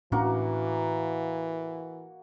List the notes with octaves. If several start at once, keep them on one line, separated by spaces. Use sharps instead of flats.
A2 E3 A#3 C#4 D4 F#4